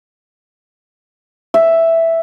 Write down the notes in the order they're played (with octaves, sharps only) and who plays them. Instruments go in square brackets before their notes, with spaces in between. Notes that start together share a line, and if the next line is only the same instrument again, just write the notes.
[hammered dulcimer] E5